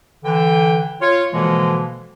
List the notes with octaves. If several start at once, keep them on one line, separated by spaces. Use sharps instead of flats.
D3 E3 G5
F4 C#5
B2 D3 E3 F3 G#3 A#3